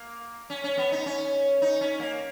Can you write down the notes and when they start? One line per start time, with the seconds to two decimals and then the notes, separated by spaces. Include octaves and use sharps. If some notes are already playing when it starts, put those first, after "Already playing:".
Already playing: A#3
0.50 C#4
0.64 C#4
0.78 B3
0.92 D#4
1.06 C#4
1.62 D#4
1.81 C#4
2.00 A#3